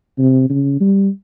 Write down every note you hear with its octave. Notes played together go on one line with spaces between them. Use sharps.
C3
C#3
G3